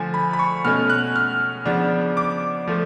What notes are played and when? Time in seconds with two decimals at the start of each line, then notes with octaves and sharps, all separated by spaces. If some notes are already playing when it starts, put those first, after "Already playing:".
Already playing: D3 F3 A3 G#5
0.14 B5
0.33 B5
0.39 C#6
0.65 B2 A3 C#4 F6
0.90 F#6
1.16 F6
1.65 C#3 F3 B3 D4
2.17 D6
2.67 F3 A3